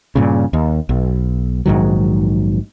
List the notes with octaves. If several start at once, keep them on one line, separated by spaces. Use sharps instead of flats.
G2 A#2 C#3
D#2
B1
A#1 G#2 D#3 F#3